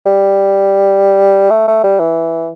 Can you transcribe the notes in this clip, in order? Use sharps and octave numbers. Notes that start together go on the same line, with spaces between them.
G3
A3
A3
G3
E3